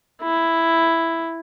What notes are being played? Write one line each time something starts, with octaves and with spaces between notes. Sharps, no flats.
E4